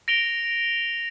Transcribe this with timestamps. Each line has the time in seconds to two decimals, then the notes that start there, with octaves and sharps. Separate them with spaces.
0.08 A#6 D7 F7 G7